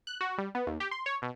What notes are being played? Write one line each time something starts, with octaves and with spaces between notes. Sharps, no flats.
F#6
F#4
G3
B3
D#2
G4
C6
C#5
B2